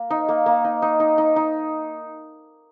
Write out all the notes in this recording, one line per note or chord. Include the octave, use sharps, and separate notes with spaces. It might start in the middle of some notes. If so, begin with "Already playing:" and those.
Already playing: A#3
D#4
A#3
A#3
D#4
D#4
D#4
D#4
D#4